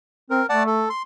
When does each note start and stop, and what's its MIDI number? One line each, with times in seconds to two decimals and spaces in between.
0.30 0.42 60
0.30 0.46 70
0.49 0.86 57
0.49 0.63 74
0.49 0.63 78
0.49 0.63 81
0.67 0.89 69
0.90 1.02 84